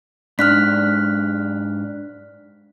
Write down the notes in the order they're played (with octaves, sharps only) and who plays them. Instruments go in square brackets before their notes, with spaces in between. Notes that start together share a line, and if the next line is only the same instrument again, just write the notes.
[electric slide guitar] G#2 D4 [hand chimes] F6 F#6 B6